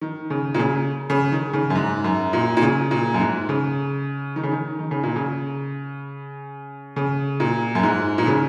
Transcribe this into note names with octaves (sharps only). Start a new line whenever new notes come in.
D#3
C#3
A#2
C#3
C#3
D#3
C#3
F#2
G#2
F#2
A#2
A#2
C#3
A#2
F#2
G#2
C#3
D#3
C#3
D#3
D#3
C#3
A#2
C#3
C#3
A#2
F#2
G#2
A#2
C#3